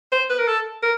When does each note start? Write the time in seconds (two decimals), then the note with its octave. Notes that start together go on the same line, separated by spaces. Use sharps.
0.12 C5
0.30 B4
0.38 A#4
0.48 A4
0.83 A#4